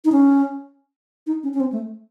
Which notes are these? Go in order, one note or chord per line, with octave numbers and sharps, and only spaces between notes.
D#4
C#4
D#4
C#4
C#4
C4
A3